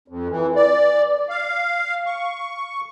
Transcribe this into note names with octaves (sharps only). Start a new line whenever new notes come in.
F2
E3
D5
F5
C#6